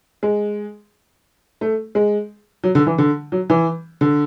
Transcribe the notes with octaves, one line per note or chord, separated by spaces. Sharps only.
G#3
A3
G#3
F#3
D3
E3
D3
F#3
E3
D3